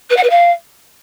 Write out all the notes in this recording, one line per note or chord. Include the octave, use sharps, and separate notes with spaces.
B4
F#5
B4
F5